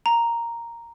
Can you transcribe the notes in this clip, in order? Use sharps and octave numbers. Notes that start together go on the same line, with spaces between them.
A#5